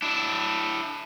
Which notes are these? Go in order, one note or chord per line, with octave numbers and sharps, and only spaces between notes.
D4 E4